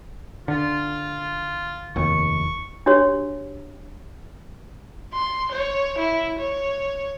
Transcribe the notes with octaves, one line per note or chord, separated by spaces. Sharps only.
D3 F4
F1 D#2 C#6
D4 F#4 G4 C#5
C6
C#5
E4
C#5